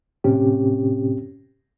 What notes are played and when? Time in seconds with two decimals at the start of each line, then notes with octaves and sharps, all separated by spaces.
0.24 A2 C3 C4 C#4 G4